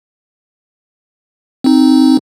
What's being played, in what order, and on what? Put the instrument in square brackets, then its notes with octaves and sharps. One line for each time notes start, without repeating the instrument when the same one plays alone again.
[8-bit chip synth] C4 D#4